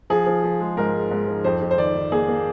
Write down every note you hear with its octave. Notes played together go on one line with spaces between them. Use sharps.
F3 G#4
F3
F3
G#3
G#2 A#4
G#3
G#2
F3
F2 C5
F2
C5
D#3 D5
D#3
A#3 G#4
A#3